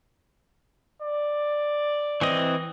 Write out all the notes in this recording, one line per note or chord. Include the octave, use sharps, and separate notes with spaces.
D5
E3 C4 D#5